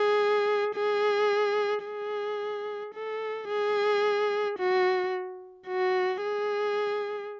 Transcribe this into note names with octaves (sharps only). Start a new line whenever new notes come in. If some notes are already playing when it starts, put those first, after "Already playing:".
Already playing: G#4
G#4
G#4
A4
G#4
F#4
F#4
G#4